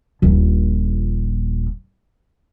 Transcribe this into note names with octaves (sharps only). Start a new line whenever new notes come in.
D#1 A#1